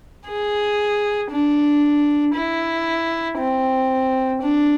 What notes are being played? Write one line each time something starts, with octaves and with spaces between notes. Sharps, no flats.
G#4
D4
E4
C4
D4